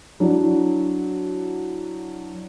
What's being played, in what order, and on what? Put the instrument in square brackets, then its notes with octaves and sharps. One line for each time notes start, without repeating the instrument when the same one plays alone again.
[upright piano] F#3 D4 E4